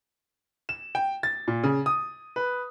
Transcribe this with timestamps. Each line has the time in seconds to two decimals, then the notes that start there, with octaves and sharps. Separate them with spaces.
0.69 E7
0.95 G5
1.23 A6
1.48 A#2
1.63 C#3
1.86 D#6
2.36 B4